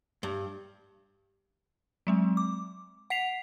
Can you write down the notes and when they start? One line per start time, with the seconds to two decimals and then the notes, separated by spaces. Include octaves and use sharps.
0.23 G2
2.07 F#3 G#3 C4
2.37 D6
3.10 F#5 B6 C7 F7